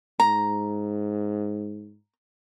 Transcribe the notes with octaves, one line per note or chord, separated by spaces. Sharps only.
G#2 A#5